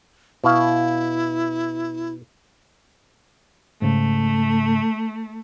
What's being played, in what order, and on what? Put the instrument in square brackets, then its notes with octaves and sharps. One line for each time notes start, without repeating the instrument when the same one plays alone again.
[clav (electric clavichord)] B2 F5 [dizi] E4
[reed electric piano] G#2 C#3 [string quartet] A3